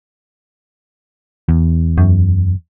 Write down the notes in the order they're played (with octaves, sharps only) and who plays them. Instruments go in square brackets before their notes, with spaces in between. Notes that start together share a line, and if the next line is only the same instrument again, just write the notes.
[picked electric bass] E2
[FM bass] F#2